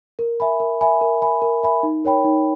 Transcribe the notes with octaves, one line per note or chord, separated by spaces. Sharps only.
A#4
E5 G#5 B5
A#4
E5 G#5 B5
A#4
E5 G#5 B5
A#4
E5 G#5 B5
D#4
A#4 C#5 G5 B5
D#4